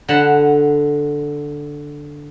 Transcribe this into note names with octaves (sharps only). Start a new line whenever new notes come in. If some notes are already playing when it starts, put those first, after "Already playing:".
D3 F#5 A5 B5